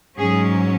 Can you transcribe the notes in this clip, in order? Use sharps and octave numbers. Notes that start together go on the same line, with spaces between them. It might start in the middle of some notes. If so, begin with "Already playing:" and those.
G#2 F#3 C#4 G#4